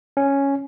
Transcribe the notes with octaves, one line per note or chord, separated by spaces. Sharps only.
C#4